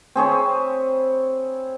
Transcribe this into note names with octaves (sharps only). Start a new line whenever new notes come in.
C4 G#4 C#5 B5